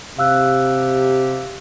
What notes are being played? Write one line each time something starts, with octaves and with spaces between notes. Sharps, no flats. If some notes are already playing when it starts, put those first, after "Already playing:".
C3 G4 F5 E6 F#6